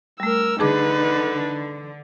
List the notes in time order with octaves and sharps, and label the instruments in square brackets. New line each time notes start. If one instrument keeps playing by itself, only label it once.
[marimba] G3 A3 [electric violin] A#4 E6
[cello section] D3 [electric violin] D#4 B4 [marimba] G#4 A5 D6